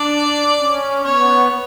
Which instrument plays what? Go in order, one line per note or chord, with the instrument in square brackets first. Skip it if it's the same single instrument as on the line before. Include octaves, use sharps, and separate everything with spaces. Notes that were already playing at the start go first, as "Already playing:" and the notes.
Already playing: [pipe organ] D4 [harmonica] D5
[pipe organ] C#4
[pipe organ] B3 [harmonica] C#5